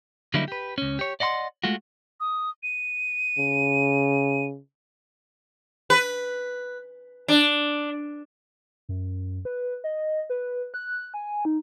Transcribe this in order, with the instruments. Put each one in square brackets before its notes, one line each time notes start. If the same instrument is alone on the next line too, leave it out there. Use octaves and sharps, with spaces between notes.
[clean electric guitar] D3 F#3 G3 A#3 D#4 E4
G4 B4
C#2 C#4
G4 C#5
D5 D#5 F#5 B5 C6
G#3 A3 F4 F#4
[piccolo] D#6
D#7
[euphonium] C#3
[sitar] B4
D4
[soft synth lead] F#2
B4
D#5
B4
F#6
G#5
D#4